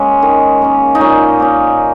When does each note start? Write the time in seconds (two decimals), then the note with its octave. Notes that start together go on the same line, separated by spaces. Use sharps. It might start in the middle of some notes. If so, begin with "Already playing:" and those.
Already playing: G#3 A#3 C#4
0.22 D#3
0.62 A#3 C#4
0.95 D#4
1.01 A#2 C#4
1.40 A#3 C#4